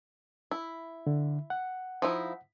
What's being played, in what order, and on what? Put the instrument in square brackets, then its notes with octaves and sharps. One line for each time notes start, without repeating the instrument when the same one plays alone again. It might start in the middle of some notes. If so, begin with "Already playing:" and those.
[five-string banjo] E4
[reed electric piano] D3
F#5
[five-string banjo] F3 D#4 E4